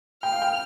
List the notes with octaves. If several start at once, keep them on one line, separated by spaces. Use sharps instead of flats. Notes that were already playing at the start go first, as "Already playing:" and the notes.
G5 F6
F5
G5